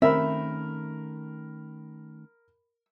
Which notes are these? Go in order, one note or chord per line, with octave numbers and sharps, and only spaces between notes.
D#3 A3 C4 C#4 A#4 E5 B5